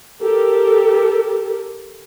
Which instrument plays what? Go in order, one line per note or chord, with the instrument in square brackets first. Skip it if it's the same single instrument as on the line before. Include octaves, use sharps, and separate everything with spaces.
[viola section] G4 A4 A#4